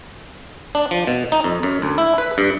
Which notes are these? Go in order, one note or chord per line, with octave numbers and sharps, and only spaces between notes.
D4
F3
B2
D#4
F2
F#2
D2
E4
B4
G2